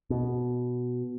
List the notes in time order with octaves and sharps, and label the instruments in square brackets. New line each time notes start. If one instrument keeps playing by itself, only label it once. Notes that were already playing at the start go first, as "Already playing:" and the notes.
[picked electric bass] B2